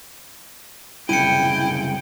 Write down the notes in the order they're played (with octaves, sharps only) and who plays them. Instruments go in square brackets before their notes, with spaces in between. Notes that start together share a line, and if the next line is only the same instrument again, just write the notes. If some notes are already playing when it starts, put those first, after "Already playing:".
[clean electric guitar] C2 F#2 C#3 [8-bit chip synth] E4 [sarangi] G5 [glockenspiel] C#7 D#7